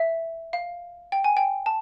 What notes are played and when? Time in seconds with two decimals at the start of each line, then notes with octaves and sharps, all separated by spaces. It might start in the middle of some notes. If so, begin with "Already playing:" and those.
Already playing: E5
0.53 F5
1.12 G5
1.24 G#5
1.37 G5
1.66 A5